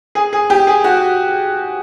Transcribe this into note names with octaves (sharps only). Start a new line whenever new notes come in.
G#4
G#4
G4
G#4
F#4